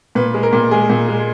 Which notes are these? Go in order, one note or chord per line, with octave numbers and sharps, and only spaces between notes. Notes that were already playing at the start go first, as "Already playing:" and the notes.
A#2 B4
G#3
A#4
A#2
G#3 G#4
A#2
G#3